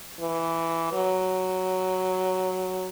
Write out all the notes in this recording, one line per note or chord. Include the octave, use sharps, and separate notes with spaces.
E3
F#3